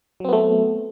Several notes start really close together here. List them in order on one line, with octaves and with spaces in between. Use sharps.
F#3 C4 B3 A3